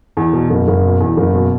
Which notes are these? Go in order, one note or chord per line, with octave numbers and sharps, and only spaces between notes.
E2
B2
F#1
F#1
B2
E2
F#1
B2